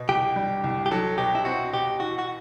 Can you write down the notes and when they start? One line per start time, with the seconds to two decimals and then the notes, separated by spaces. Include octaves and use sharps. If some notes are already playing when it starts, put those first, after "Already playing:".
Already playing: B2
0.09 C2 G4
0.36 G3
0.64 C2
0.86 G4
0.91 F#3 A4
1.18 B2 G4
1.35 E4
1.45 C4 F#4
1.73 B2 G4
2.00 E3 F#4
2.19 F#4